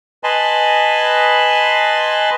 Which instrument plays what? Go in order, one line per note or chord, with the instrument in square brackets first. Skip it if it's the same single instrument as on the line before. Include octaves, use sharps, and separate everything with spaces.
[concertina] B4 D#5 G#5 A5 B5 C6